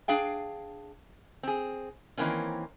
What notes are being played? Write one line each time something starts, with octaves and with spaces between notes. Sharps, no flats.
D4 G#4 F5 G5
C4 G#4
D#3 E3 A#3 C4 C#4